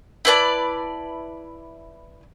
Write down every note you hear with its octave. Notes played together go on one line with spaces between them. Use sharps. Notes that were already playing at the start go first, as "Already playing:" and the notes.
E4 B4 D5 A5